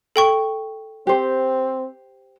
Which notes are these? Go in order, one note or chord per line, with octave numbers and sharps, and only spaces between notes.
A4 G5 C#6
C4 G4 C5